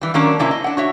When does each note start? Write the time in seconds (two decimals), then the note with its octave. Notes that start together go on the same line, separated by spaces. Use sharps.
0.01 E3 G3
0.14 D#3 F#3 A#3 C#4 D4
0.39 C3 A#3 C#4 E4
0.51 D#5
0.64 D4 F#5
0.77 F#4 C#5 E5